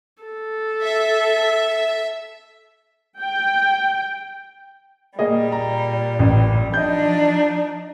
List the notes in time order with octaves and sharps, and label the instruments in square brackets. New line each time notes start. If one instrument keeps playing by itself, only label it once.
[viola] A4
[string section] E5
[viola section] G5
[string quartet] A#2 G3 [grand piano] A#3 G#4 D#5
[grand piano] A#5
A1
[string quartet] F3 D4 D#4 [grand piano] D#5 G6